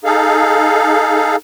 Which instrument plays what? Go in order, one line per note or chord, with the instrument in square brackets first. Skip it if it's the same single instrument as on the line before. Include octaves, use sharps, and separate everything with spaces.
[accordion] D#4 G#4 A4 F5